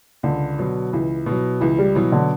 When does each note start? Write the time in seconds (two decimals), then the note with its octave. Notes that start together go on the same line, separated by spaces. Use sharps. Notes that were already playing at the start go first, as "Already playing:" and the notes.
0.23 C#2 D3
0.59 B2 F#3
0.93 C#2 E3
1.26 B2
1.31 F#3
1.61 C#2 E3
1.79 G3
1.95 B2 E3 F#3
2.12 D3